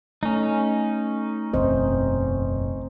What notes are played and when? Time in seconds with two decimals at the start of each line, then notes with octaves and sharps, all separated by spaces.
0.23 A3 C#4 D#4
1.54 F#1 B1 E2 C4 C5 D#5